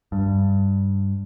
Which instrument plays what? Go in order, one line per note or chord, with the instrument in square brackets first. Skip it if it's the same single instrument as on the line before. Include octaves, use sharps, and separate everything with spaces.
[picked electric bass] G2